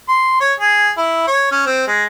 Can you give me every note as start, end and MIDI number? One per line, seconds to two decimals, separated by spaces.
0.08 0.40 84
0.40 0.53 73
0.60 0.90 68
0.97 1.23 64
1.27 1.50 73
1.51 1.65 61
1.66 1.84 60
1.87 2.04 56